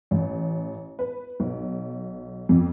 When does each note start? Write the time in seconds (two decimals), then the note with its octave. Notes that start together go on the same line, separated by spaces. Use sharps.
0.11 A1
0.99 B4
1.40 B1
2.49 F2